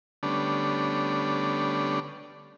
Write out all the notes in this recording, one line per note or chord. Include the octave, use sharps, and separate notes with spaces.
D3 G3 A3 B3 C#4 D4